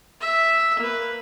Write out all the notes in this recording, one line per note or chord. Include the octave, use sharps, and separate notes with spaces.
E5
A#3 B4